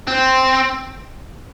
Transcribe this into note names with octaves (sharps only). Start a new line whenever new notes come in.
C4